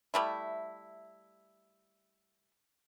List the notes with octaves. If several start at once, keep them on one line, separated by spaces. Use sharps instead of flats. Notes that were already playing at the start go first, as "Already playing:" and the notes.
G3 A3 E4